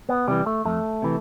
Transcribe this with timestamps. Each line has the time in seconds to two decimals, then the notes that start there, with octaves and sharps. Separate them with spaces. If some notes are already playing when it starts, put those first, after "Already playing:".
0.09 B3
0.28 C3 E3 G3
0.46 A3
0.65 F2 A3
1.02 C3 E3